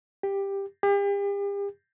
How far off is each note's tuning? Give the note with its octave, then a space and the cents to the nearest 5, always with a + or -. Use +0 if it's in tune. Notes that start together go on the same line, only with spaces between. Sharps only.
G4 +10
G4 +40